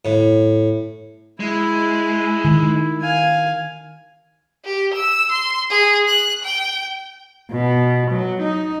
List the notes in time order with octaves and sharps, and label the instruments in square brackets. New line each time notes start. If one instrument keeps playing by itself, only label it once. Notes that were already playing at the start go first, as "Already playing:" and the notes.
[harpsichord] A2
[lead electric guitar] G#3 [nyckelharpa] E4
[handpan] D#3
[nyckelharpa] F5 G#5
[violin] G4
E6
C6
G#4
F#6
G5
[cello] B2
F#3
D#4